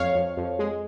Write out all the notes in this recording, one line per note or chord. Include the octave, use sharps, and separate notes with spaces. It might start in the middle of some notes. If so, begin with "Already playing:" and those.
Already playing: F2 C#5 F5
F2
F2
G#3